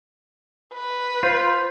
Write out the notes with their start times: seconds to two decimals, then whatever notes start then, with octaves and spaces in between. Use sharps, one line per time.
0.74 B4
1.23 F4 C5 G6 C7